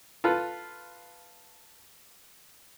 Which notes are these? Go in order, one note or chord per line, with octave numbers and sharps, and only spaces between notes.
F4 A4 B4